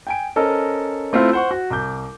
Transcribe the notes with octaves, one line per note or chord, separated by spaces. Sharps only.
G5 G#5 D7
C#4 A4 A#4 C5 D#5
A3 C4 E4 F4
C5 F#5 C#6
F#4
C2 D6 G6